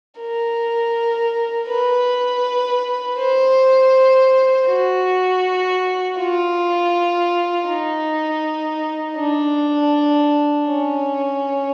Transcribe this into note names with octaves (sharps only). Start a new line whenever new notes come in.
A#4
B4
C5
F#4
F4
D#4
D4
C#4